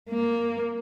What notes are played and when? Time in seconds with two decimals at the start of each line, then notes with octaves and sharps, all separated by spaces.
0.11 A#3